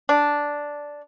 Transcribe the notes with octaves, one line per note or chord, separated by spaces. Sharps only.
D4